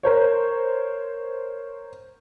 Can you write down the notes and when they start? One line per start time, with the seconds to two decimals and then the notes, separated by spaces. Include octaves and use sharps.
0.03 A#4 C5 C#5